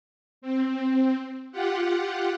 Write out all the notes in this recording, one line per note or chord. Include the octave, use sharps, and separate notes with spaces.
C4
F4 G4 F#5